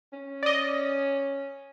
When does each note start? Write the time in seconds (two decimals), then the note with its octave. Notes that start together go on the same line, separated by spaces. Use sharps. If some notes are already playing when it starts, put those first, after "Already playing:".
0.13 C#4
0.43 D5 D#5